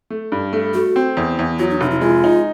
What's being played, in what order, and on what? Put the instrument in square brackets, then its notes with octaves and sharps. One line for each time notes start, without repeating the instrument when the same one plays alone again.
[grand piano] A3
G2
A3
[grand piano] A3 [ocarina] F#4
[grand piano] C4
E2
E2
[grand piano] F#3 [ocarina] F4
[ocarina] D#4
[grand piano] F1 [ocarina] D#4
[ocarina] E4
[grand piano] G#3 [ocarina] F4
[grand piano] D#4